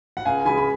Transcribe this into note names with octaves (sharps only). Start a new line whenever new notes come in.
F#5
C#2 F5 G#5
C#3 G#3 G#5 B5
B5